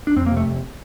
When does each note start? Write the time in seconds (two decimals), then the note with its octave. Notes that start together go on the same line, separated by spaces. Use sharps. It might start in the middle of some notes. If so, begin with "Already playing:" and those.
0.07 D4
0.16 F2 C4
0.26 A#3
0.31 C3
0.37 A3
0.46 F1